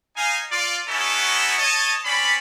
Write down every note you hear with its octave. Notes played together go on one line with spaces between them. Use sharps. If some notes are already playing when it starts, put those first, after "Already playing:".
D#4 F5 G#5
F4 D5
B3 C#4 D#4 E4 F#4 A4
C#5 D#5 A5
C4 C#4 D5 B5